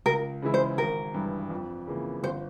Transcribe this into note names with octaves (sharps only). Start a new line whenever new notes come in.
C#2 A#4
C#3 E3 G#3 E4
C5
G#1 A#4
G2 E3
F2
C#3 E3 A#3
G1 C5